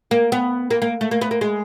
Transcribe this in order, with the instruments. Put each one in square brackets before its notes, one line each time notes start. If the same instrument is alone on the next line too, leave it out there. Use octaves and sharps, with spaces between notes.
[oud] A#3
B3
A#3
A#3
A3
A#3
B3
A#3
G#3